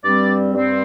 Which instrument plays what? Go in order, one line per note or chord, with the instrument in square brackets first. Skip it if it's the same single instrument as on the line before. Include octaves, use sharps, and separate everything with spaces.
[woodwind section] G2 G3 C4 D5
G2 G3 C4